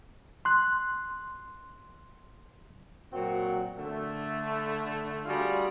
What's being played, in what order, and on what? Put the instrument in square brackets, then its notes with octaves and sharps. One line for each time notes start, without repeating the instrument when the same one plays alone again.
[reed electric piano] C6 F#6
[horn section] A#2 F#3 C4 F#4
D3 A3
G3 D4 F4 F#4 G#4